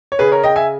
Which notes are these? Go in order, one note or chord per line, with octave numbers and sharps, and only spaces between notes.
C#5
C#3 G#4 B4
A#4 C#5
C#3 D#5 G5
E5 G#5